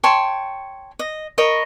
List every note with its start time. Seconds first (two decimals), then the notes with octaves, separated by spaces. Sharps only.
0.04 C#5 G5 A5 C6
0.99 D#5
1.38 A#4 C#5 D#5 B5